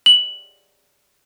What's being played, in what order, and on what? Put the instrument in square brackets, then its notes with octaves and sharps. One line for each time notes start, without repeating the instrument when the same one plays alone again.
[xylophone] F#7